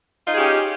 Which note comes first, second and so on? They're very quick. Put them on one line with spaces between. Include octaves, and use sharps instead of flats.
F4 D#4 G#4 G4 C#4